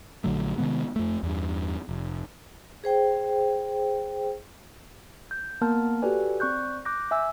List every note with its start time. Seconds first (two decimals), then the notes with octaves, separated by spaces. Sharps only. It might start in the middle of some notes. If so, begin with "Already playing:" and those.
0.24 A#1 D3 F#3 A3
0.58 C3 D#3 G#3 B3
0.96 F2 A3
1.23 E2 G2
1.89 F1
2.84 G#4 C5 G5
5.31 G6
5.61 A#3 B3 A#4 A5 F6
6.02 F#4 G4 A4 B4 D5 G#5
6.40 C4 D5 C#6 F#6 G6
6.85 D6 F#6 G6 A#6
7.11 E5 G#5 E6